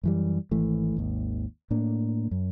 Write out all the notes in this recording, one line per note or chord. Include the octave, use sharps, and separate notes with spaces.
F#2 E3 G3
G#1 E3 A3
G#1 D#2
A2 A#3 D4
F#2